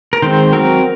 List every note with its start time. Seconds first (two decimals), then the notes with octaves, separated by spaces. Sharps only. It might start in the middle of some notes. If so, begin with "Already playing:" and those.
0.13 A#4
0.22 D#3 G#3 C4 C5
0.53 F#3 C4 A#4